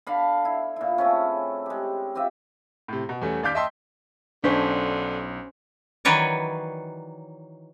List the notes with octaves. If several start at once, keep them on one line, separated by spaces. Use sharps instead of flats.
D3 F5 B5
E4
A#2 E4
C#3 A3 C4 C#4
G#3 G4
C4 F4 G4 E5
A2 C3
B2
E2 G3 A3 C#4
D#2 D5 F5 D6 G6 B6
D#5 E5 G5 A5 C6 E6
B1 D3 C#4 D4 C5 B6
D#3 E3 F#3 B4 C#5 D5